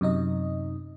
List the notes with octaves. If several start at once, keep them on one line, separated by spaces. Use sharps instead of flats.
F#2 C3 D#4 D#5